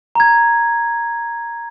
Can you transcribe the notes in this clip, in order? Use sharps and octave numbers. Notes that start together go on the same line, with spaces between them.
A#5 G#6